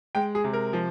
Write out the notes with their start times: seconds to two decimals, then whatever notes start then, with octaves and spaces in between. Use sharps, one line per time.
0.15 G#3 G5
0.35 G#4
0.44 C3
0.53 A#4
0.73 F3